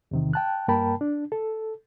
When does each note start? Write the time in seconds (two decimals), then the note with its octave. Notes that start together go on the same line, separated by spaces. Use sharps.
0.11 E2 C3 D#3
0.33 G5 A5 F#6
0.68 G2 A#3 A#4 G5 A5 B5
1.01 D4
1.32 A4